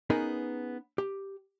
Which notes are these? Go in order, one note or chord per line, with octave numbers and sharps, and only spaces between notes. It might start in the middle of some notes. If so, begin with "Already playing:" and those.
B3 C#4 D#4 G#4 A#4 B4
G4